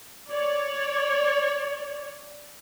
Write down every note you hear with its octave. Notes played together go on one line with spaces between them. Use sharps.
C#5 D5